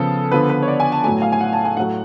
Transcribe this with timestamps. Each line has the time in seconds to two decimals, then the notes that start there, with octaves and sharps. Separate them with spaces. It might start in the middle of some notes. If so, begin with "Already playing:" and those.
Already playing: C#3 F3 B3 A4
0.31 D3 F3 B3 B4
0.49 B4
0.62 C#5
0.68 D5
0.80 G#5
0.92 A5
1.04 A2 F#3 A3 G#5
1.22 F5
1.32 G#5
1.41 F#5
1.53 A5
1.65 G#5
1.77 A2 F#3 A3 F#5